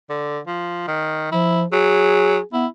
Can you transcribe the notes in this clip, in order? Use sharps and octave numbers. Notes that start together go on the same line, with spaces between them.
D3
F3
D#3
F3 E4
F#3 G#4
B3 E4